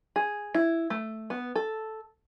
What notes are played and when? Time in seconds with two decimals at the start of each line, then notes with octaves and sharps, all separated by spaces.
0.16 G#4
0.54 E4
0.90 A3
1.30 B3
1.55 A4